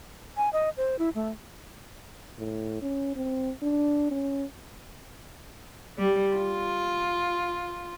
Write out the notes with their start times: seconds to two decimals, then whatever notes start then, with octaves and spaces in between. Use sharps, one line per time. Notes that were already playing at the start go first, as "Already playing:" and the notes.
0.37 G#5
0.53 D#5
0.77 C5
0.99 E4
1.15 A3
2.38 A2
2.82 C#4
3.16 C4
3.62 D4
4.11 C#4
5.98 G3
6.35 F4